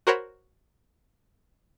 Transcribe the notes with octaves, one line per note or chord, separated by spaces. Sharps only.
F#4 A#4 C5 C#5 F#5 B5